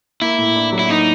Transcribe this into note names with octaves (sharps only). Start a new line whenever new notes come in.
A#3 E4
A2
D4
F#3
E4
A#3 D#4